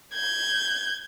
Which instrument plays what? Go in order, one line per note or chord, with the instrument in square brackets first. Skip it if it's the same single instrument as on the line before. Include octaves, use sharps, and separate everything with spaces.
[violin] G6 G#6